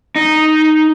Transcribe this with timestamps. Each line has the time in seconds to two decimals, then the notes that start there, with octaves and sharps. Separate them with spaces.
0.16 D#4